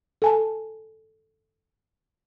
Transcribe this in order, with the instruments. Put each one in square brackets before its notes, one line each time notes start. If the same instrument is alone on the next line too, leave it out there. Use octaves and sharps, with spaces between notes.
[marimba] A4 G#5 A5